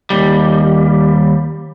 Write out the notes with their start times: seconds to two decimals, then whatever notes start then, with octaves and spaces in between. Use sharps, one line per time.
0.10 D#2 G3